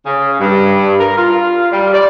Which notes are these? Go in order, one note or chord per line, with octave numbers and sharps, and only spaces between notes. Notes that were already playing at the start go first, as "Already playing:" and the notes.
C#3
G2
A#4
F4
G3
D5